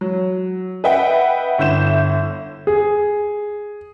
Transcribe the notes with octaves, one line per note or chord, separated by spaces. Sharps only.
F#3
B4 D#5 E5 F#5 G5
G1 D3 E4 G6 E7
G#4